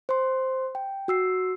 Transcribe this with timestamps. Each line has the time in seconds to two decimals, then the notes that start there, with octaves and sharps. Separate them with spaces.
0.09 C5 C6
0.75 G5
1.08 F#4 E6 C7